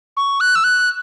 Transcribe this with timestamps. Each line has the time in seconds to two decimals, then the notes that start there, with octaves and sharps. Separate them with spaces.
0.17 C#6
0.40 F#6
0.55 E6
0.64 F#6